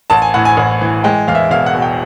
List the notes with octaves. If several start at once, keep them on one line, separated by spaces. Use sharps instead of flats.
A1 A5
G#5
A2 F#5
G#5
A1
E3
G#3 G5
E2 F5
E5
E1 F5
F#5
B2
G5